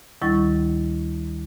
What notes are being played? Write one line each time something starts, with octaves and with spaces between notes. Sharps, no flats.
D2 D#3 G3 E4 C#6 A6